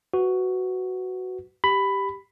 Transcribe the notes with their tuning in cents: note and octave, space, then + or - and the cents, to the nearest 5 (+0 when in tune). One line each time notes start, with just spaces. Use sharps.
F#4 +5 B4 +15
G4 +0 B5 +10